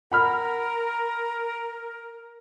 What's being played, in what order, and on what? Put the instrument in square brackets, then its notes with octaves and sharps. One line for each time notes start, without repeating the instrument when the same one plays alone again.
[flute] A#4 [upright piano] F#5 B5 F6